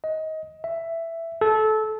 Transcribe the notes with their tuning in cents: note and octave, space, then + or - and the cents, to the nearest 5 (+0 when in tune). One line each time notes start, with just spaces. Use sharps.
D#5 +20
E5 +10
A4 -20